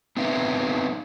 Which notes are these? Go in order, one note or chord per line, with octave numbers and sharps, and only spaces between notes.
B3 C4 D#4 B4 E5 F5